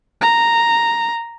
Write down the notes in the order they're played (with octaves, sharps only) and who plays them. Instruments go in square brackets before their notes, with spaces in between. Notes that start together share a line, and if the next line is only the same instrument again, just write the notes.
[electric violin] A#5